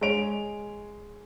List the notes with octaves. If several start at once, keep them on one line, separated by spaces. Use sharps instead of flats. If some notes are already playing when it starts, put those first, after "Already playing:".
G#3 C#5 D7 F7